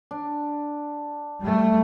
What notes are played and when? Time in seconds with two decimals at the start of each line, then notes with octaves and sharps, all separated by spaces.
0.11 D4
1.41 G3 A3